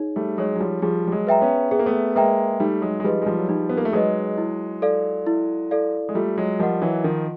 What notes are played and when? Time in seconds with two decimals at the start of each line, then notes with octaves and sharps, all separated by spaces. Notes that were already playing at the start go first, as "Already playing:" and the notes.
Already playing: D#4 G#4 C#5
0.16 G3 A3
0.38 F#3 G#3 G#4 C#5
0.56 F#3
0.60 F3 G3
0.82 F3 G3 G#4
1.07 G3
1.12 F#3 G#3
1.27 B4 E5 G5 A#5
1.41 B3 C#4
1.71 B3 G#4
1.79 A#3
1.86 A3 B3
2.16 G#3 A#3 B4 E5 G5 A#5
2.60 G3 A3 D#4
2.82 F#3 G#3
3.00 G#3
3.04 F3 G3 G#4 B4 D#5
3.22 G#3
3.26 F3 G3
3.38 F#3
3.49 F3 G3 D#4
3.69 B3
3.77 A#3
3.85 A3
3.93 F#3 G#3 G#4 B4 D#5
4.38 E4
4.82 A4 D5 F5
5.27 E4
5.71 A4 D5 F5
6.09 G#3
6.15 G3 A3 F4
6.37 F#3 G#3
6.59 F3 G3 A#4 D#5 F#5
6.82 E3 F#3
7.04 D#3 F3 F4